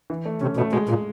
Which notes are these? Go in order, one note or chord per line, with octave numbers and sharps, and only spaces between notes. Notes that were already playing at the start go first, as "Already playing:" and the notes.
E3
A3
C3 C#4
B2 A3
B2 G#3
A#2 G#3